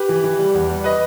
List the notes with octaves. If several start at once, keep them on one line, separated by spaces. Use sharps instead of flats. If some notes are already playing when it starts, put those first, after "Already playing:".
Already playing: G4 B4
E3
E3
G3
E2
G3
B4 D#5